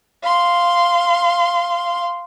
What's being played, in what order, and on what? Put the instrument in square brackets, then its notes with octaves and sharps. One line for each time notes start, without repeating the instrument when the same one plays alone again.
[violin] F5 C6